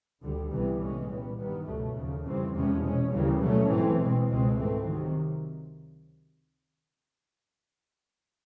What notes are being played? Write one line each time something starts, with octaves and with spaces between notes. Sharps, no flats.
D2 D3 G3
C2 C3 E3 G3 B3
A2 E3 G#3 C#4
A#2 G3 B3
G2 D#3 G3 B3
C#2 B2 F#3 A3
D#2 C#3 F3
F2 C#3 E3 G3 C4
E2 C3 F3 G#3 C#4
B2 G#3 C#4
D2 C#3 E3 G3 A#3
B2 F#3 A3 C#4
G#2 E3 A3 C4
B2 G#3 C4
C#2 B2 G#3 C4
G#2 E3 A3 C4
C3 D#3 F#3